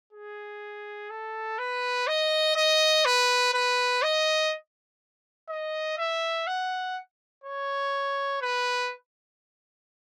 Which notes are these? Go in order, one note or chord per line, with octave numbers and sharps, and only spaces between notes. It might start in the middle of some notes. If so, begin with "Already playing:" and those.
G#4
A4
B4
D#5
D#5
B4
B4
D#5
D#5
E5
F#5
C#5
B4